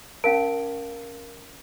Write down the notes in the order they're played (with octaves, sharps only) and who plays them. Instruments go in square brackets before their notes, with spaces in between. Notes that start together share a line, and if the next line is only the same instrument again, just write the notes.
[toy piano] C#4 F5 A5 [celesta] A#4 D7